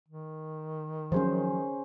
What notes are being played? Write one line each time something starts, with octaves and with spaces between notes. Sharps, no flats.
D#3
F3 F#3 C#4 G#4 C5